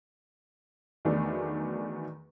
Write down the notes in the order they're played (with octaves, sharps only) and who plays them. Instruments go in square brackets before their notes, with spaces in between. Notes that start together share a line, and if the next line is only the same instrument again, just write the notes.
[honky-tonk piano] E2 D#3 F#3 A3 D4